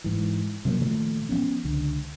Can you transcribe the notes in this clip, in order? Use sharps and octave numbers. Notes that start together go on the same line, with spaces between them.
G#2 E3
C3 F#3 A3 A#3
A#2 D#3 F3 A3
F3 B3 C#4
C#2 D3